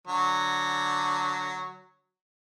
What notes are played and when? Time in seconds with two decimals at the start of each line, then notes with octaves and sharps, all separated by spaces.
0.07 D3 F#3